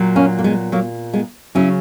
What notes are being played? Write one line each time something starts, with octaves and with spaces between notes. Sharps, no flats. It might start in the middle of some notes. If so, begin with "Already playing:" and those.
Already playing: A#2 F#3
A#3 C#4
A#3
G#3 B3
F#3 A#3
G#3 B3
C#3 F#3 C#4 E4